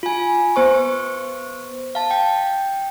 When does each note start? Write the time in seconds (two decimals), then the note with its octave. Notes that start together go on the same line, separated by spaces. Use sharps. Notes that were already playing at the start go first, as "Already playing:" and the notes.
0.03 F4 G#5
0.56 B3 C5 C#6
1.95 F5 A5
2.11 G5